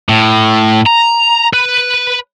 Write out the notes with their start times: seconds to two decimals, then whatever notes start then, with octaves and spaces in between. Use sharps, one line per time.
0.09 A2
0.87 A#5
1.53 B4